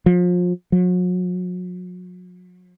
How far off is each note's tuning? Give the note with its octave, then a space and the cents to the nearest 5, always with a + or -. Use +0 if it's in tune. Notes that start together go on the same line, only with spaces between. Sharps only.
F3 +30
F#3 -40